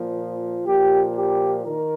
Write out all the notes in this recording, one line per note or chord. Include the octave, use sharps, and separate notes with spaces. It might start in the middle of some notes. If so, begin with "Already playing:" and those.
Already playing: A#2 F3
A#2 F3 G4
G4
D#3 A#4